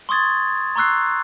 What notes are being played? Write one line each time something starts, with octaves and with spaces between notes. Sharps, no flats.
C6 C#6 D#6 G#6 A6
A#5 C6 C#6 E6 F#6 C7